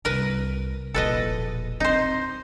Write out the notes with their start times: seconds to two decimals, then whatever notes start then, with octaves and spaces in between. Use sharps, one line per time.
0.05 C2 A#4 B4
0.94 E1 A#1 A4 B4 D#5
1.80 C4 D#4 C5